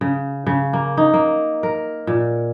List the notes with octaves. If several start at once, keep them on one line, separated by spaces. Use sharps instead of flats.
C#3
C#3
A#3
D#4
A#3
A#4
A#2